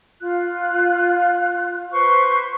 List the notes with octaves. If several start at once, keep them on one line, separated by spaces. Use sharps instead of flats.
F4 F#6
B4 C5 C6 C#6